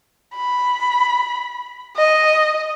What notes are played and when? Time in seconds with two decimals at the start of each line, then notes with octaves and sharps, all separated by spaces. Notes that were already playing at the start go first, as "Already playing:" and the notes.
0.36 B5
1.97 D#5